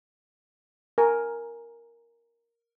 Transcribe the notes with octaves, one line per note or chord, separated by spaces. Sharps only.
A#4 G#5